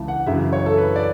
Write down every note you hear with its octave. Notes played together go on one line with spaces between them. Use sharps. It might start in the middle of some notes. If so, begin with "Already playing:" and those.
Already playing: C#2 C#3 E3 A5
F#5
F#2 C#3 E3 E5
C#5
A4
B4
D5